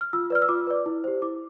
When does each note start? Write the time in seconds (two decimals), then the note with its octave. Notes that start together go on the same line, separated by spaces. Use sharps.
0.01 F6
0.13 F4 E6
0.30 B4 D5 F6
0.42 E6
0.49 F4 D6
0.67 B4 D5
0.86 E4
1.04 G4 C5
1.22 E4 D6